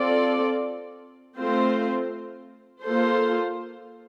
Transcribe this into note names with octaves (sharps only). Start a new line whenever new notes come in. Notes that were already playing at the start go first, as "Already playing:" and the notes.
Already playing: C4 F4 A4 D5
A3 C4 F4 C5
A#3 F4 A4 C5